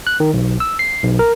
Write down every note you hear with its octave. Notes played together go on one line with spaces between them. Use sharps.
F#6
D#3
B1
E6
C7
B1
A#4